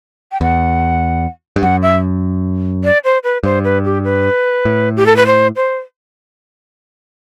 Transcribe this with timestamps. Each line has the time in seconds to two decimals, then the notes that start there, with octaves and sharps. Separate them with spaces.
0.32 G5
0.41 E2 F#5
1.56 G2
1.62 F#2 F#5
1.82 E5
2.84 D5
3.04 C5
3.24 B4
3.43 G2 C5
3.64 B4
3.85 G4
4.04 B4
4.65 A2
4.97 G4
5.06 A4
5.16 B4
5.26 C5
5.56 C5